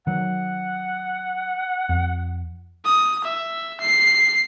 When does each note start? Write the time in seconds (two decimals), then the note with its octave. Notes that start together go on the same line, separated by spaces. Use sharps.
0.07 D#3 F#3 F#5
1.89 F2
2.85 D#6
3.24 E5
3.81 C7